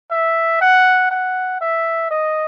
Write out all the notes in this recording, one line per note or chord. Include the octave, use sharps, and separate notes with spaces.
E5
F#5
F#5
E5
D#5